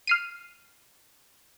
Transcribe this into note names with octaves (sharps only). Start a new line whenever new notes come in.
F6 C7 D#7